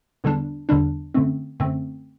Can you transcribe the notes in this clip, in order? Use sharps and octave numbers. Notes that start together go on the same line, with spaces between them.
E2 D3 G3 D4
E2 D3 G3 D4
F#2 D3 A3 C4
F#2 D3 A3 C4